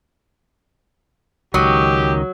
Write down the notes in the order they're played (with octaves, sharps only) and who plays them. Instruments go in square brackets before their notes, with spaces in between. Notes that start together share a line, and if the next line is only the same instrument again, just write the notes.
[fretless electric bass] C#2 [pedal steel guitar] D#3 D#5 [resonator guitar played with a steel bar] F#3 [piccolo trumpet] G4